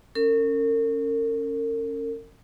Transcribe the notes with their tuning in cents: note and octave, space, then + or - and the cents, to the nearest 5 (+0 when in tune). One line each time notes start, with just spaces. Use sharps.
C#4 -5 A#4 -40